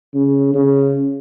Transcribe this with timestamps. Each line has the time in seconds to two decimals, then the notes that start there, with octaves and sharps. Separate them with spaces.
0.15 C#3
0.54 C#3